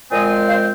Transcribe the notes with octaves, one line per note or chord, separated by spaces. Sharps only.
A#2 F3 G#3 C4 D#5 G#5
C5 F5